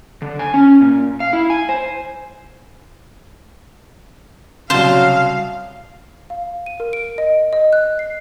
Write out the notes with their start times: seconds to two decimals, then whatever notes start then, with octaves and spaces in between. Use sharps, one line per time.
0.22 D3
0.39 G#5
0.54 C#4
0.81 A#2
1.20 F5
1.33 E4
1.50 G#5
1.69 C5
4.70 C2 C#3 F#3 C5 F5 A5
6.30 F5
6.66 D#7
6.80 A#4
6.93 D7
7.18 D#5
7.53 D#5
7.73 F#6
7.99 C7